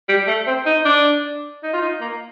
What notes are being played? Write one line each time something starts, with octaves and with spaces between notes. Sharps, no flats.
G3
A3
C4
D#4
D4
D#4
F4
D#4
A#3